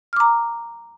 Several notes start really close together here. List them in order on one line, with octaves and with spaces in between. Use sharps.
F6 D6 A#5